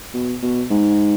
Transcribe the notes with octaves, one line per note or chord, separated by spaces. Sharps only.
B2
B2
G#2